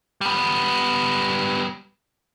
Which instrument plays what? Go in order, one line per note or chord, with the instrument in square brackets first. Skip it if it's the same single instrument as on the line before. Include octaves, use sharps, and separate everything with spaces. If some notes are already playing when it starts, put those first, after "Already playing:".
[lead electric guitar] G3 B3